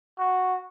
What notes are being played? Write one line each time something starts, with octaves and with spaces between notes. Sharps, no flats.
F#4